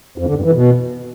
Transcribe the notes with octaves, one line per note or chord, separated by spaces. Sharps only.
F2
D3
G2
E3
B2